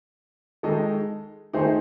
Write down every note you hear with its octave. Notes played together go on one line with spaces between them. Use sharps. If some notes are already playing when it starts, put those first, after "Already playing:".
D#3 G#3 D#4 A4 D#5
D#3 A3 D#4 G#4 C5